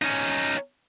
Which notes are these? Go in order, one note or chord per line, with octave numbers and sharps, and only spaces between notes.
C#4 D#4